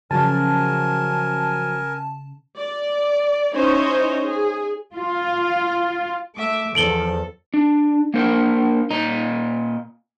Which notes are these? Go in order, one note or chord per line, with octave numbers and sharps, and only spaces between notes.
C#3 F3 F#3 A#4 G#5 A5
D5
C#4 D#4 E4 C5 C#5 D#5
G#4
F4
A3 E5 D6
E2 F3 A4 D7 F#7 G7
D4
A#3 D4 A#4 C5
A#2 D#5 A#5